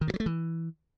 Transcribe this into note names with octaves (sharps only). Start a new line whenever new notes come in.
D#3
G2
F#3
A3
E3